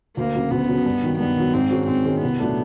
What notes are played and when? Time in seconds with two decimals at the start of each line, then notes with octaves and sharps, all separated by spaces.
0.17 D2 A#3
0.35 C#3 F#3
0.51 D2 B3
0.69 C#3 F#3
0.86 G2
1.03 D#3 F#3
1.19 G2 B3
1.36 D#3 F#3
1.54 G#2 C4
1.71 D#3 G#3 C#4 F#4
1.87 G#2 C4
2.05 D#3 G#3 C#4 F#4
2.21 C2 B3
2.40 A#2 F#3 A3 D4